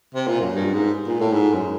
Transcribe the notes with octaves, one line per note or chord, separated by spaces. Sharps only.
C3
A#2
F#2
G2
G#2
A#2
A2
G#2
F#2